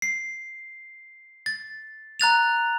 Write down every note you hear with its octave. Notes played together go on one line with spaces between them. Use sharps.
C7
A6
A#5 F#6 A6 F7